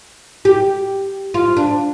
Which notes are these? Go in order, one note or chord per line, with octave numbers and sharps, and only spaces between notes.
G4
F4
D4